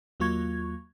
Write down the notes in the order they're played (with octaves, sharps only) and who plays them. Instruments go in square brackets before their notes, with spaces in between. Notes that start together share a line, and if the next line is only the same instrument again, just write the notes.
[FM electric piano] D#2 F#3 A#3 F4 C#6 G#6